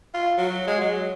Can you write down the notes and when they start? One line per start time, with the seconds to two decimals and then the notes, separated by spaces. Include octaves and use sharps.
0.14 F4
0.38 F#3
0.67 G#3
0.81 F#3